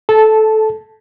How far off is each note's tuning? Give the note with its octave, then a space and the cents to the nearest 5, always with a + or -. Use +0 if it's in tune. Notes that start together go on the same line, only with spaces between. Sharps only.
A4 -15 A5 +0